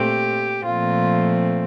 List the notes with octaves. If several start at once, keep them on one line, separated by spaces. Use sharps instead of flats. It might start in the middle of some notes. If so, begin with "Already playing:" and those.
Already playing: A#2 A3 C4 G4
A#2 F3 A3 C4 F4